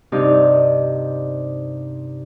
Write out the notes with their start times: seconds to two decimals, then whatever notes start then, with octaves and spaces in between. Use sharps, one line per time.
0.12 G2 C3 D#4 G4 F5